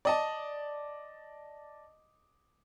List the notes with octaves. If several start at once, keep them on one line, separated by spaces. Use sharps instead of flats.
D5 D#5 A5